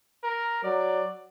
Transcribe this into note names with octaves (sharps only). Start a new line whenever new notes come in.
A#4
F#3 D5